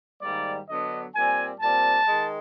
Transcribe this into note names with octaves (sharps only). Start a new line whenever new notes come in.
G#2 D#3 G3 A#3 D5
D3 F#3 B3 D4 D#5
A#2 G3 C4 G#5
A#2 G3 C4 A5
D#3 G#3